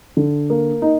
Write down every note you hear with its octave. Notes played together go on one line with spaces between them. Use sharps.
D3
A#3
D#4